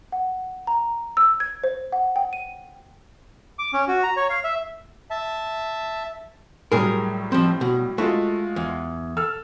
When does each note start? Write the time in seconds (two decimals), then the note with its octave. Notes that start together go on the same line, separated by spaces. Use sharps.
0.12 F#5
0.67 A#5
1.17 E6
1.40 G#6
1.64 C5
1.92 F#5
2.16 G5
2.33 D#7
3.59 D6
3.73 C#4
3.88 F#4
4.03 A#5
4.17 C#5
4.30 F5
4.44 E5
5.11 E5 A5
6.72 A2 F#3 G3 G#4 A#4
7.32 F3 C4
7.61 B2
7.98 G#3 A3 F4 F#4
8.56 E2
9.17 A4 E6 F6